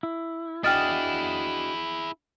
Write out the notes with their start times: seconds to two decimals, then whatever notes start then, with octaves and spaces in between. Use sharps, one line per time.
0.03 E4
0.64 D4 E4 F#4 G#4 D#5 G5 F6 A6